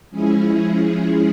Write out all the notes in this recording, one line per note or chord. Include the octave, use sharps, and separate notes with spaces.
F3 G#3 C#4 E4 G#4